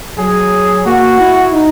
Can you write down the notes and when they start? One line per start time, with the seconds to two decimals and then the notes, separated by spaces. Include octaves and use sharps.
0.18 F#3 G#4
0.86 A#3 F#4
1.19 E4
1.54 D#4